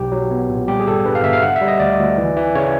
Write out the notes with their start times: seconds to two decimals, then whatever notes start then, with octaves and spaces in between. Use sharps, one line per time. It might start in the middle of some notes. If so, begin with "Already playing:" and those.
Already playing: B1 G4
0.12 F#3
0.31 B3
0.49 A#2
0.68 G3 G4
0.80 G#4
0.86 G1 A4
1.05 G2 B4
1.15 F5
1.24 G1 E5
1.33 F5
1.42 D3 F#5
1.56 E5
1.61 G3
1.68 D#5
1.80 D2 D5
1.99 D2
2.18 E3
2.36 E3
2.55 C#3 C#5